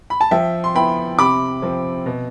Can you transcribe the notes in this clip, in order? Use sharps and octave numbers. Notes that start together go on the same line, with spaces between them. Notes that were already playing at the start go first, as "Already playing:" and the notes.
B5
A5
F3 E5 G5
C6
B3 E4 G5 B5
C3 B5 D6
F3 C4
B2